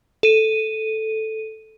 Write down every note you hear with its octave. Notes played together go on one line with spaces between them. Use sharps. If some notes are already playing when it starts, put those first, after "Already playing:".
A4 D#7